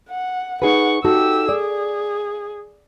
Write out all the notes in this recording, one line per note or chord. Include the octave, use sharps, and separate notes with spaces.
F#5
D#4 G#4 B4 F#5 C#6
D#4 F#4 G4 A4 E6
G#4 D5